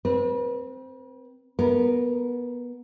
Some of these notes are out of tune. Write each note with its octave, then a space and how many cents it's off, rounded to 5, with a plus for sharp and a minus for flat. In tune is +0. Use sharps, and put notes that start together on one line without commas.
C4 -10 B4 -40
B3 -20 A#4 +0